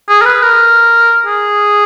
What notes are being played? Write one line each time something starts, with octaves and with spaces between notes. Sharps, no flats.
G#4
A#4
B4
A#4
G#4